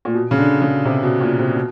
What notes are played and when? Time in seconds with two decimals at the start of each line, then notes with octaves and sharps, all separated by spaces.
0.05 A#2
0.14 B2
0.31 C#3
0.38 D3
0.61 C#3
0.85 C3
1.03 B2
1.21 A#2
1.39 C3
1.56 B2